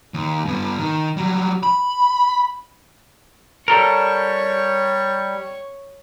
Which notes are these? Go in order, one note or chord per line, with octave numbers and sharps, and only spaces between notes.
D#2
G2 B3
D#3
F#3 G3
B5
G3 A4 A#4 C#5 C#6